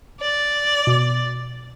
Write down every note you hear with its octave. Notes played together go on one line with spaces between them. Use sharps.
D5
B2 D6